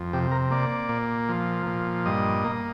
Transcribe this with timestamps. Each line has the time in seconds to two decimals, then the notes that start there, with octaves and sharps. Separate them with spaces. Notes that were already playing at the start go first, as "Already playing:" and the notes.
Already playing: F2
0.13 C3 G4
0.31 A#4
0.51 A#3 D5
0.89 A#2
1.29 F3
1.66 A#2
2.06 G2 D#5
2.45 A#3